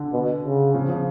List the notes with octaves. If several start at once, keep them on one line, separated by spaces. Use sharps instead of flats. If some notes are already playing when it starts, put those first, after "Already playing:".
Already playing: D3
B2
C#3
C#3 F3
C#3 F3